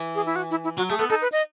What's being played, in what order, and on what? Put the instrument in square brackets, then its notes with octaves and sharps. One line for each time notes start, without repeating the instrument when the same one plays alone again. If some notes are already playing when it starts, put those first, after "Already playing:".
Already playing: [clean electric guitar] E3
[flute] G#4
E4
F#4
E4
E4
[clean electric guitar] F#3 [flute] F#4
[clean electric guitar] A3 [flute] G#4
[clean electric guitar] B3 [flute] A4
[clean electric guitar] D#4 [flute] A4
[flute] B4
D#5